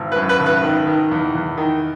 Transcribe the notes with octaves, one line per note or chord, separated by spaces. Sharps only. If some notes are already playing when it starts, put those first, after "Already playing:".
Already playing: G#1 E3
B4
F#2
B4
G#1
B4
D#3
D#3
E2
E2
D#3